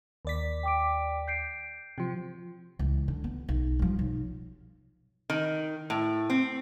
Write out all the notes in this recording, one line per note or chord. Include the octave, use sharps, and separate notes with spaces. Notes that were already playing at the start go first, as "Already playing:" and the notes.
D#2 D5 B6
G5 D6 D7
G6 C7 D7
C3 F3
C#2 E3
D3
B3
B1
G2 F3
B1
D#3
A2
C4